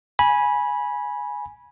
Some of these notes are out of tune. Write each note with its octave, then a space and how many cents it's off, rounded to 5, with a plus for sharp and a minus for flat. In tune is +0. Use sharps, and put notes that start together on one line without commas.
G#5 +0 B5 -20